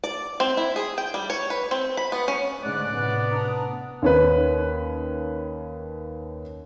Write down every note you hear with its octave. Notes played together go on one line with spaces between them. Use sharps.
D5
C4
E4
G#4
G5
G3
C#5
B4
C4
B5
B3
C#4
G#2 D3 A3 C#4 D5 F#6
A2 C3 B3
D4 A#5 D#6
D#2 C#4 B4